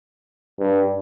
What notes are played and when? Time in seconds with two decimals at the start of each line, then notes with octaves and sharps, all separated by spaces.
0.60 G2